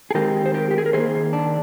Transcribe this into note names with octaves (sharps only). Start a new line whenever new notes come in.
G#4
D#3 G#3 C4 G4 A#4
C5
G4 A#4
G4
G#4
A#4
D#3 A#3 G#4 C5
D4